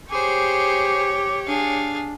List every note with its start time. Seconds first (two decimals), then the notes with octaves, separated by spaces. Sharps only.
0.10 G4 G#4 C5 C#5 D6
1.47 D4 G#4 F5